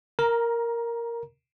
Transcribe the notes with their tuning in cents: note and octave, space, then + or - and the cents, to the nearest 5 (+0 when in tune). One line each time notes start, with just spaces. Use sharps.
A#4 +0 A#5 +20